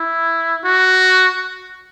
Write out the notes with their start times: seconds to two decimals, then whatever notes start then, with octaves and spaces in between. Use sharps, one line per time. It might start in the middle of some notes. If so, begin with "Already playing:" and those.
Already playing: E4
0.65 F#4